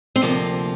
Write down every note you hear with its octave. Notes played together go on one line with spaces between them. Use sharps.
C4
D2 C3 F3 A#3